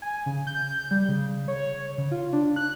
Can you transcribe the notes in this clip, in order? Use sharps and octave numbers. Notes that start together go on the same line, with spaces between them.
G#5
C#3
G6
G3
C#3
C#5
C#3
F4
D4
F#6